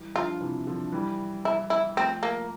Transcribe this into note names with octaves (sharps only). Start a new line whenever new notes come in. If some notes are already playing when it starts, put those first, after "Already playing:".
Already playing: E3 G3
D3 F3 F4
C3 E3
D3 F3
E3 G3
E4
E4
F3 A3 C4
A#3